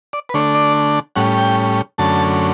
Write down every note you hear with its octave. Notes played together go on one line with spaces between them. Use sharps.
D5
B4
D3 A3 D4 C#5
D5
A2 G3 C#4 F#5
G5
F#2 D3 A3 C#4 A5